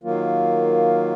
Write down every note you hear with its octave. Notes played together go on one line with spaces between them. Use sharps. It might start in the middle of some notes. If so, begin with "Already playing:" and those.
D#3 F#3 A#3 F4